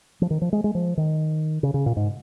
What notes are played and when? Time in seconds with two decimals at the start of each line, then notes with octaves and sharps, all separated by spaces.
0.22 F3
0.31 D#3
0.42 F3
0.53 G#3
0.64 G#3
0.75 F3
0.97 D#3
1.63 C#3
1.74 C#3
1.86 A#2
1.97 G#2